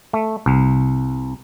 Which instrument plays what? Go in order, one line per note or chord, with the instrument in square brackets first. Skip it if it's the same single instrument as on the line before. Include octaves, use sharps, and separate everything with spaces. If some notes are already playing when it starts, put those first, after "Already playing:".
[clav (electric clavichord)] A3
C2